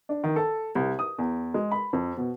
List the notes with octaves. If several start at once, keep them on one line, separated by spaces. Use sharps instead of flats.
D4
D#3
A4
C2
D#6
E2
G#3
B5
F2
B2